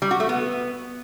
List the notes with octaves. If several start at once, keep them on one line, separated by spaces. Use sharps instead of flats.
G3
F#4
A3
B3